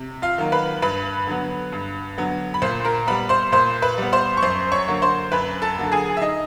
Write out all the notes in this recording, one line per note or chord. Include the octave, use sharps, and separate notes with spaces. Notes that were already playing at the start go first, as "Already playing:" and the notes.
Already playing: C3
F4 F5
D#3 F#3 A#3
B4 B5
G2 B4 B5
D3 F#3 B3
G2
D3 F#3 B3
B5
A#2 C5 C6
A#4 A#5
G3 B3 B4 B5
C5 C6
A#2 C5 C6
B4 B5
G3 B3
C5 C6
C#6
F#2 C5 C6
C#5 C#6
D3 F#3 A#3
C5 C6
F#2 B4 B5
A4 A5
D3 F#3 A#3
G#4 G#5
E5
D#4 D#5